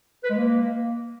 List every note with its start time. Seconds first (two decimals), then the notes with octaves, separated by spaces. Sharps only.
0.24 B4
0.30 G#3
0.37 A#3